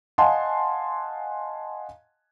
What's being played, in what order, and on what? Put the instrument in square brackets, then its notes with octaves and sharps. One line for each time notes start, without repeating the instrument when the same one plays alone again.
[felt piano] D#5 F5 F#5 G#5 A5 C6